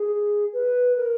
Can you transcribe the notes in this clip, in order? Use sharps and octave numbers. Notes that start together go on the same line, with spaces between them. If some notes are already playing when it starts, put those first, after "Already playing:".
Already playing: G#4
B4
A#4